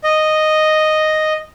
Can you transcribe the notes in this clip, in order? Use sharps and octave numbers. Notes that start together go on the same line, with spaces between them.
D#5